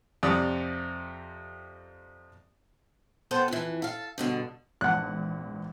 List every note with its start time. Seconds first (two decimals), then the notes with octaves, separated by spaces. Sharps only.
0.23 F2 C3 D5 D#6
3.31 B3 A4 C5 F#5 G5
3.48 F2 E3
3.82 A4 F5
4.18 G2 B2 D3
4.81 A#1 E2 G#2 F#5 F#6